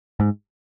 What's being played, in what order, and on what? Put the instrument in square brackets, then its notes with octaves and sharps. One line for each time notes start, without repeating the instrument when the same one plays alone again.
[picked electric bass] G#2